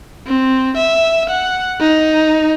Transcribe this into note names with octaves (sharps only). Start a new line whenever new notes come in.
C4
E5
F#5
D#4